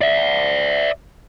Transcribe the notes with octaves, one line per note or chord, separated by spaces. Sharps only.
D5 E5